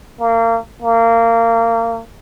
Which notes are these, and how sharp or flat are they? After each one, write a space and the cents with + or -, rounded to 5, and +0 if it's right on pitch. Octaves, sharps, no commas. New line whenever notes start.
A#3 -30
A#3 -25